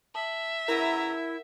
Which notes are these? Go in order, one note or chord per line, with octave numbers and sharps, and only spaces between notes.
E5 A5
C#3 E4 A#4 B4 F#5 A#5